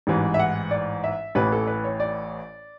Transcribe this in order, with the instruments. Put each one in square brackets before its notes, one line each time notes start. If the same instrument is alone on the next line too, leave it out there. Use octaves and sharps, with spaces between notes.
[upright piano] A1 G#2 E3
E5
F#5
D5
E5
A1 A2 E3 B4
A4
B4
C#5
D5